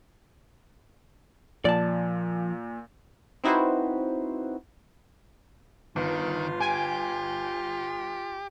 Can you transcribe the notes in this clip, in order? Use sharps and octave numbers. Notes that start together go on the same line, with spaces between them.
A#2 F3 D5 A5
C4 D#4 E4 F#4 B4 C5
G1 D#3 F4
G4 G#5